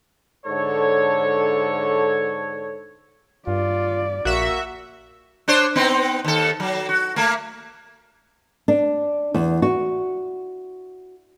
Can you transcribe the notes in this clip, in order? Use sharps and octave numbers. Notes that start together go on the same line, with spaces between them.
G#2 D3 A4 C#5
G2 F4 D5
A#1 A#3 F#4 E5
D4 C5 C#5
B3 C4 D#4
D#2 A4
F#3
F#4
A3 A#3
D4
E2
F#4